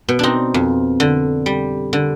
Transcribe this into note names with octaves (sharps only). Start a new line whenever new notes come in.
B2
C4 D4 D#4
F2
D3
G3
D3